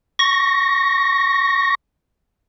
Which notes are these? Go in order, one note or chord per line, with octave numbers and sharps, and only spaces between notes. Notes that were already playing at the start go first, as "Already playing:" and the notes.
C#6 A#6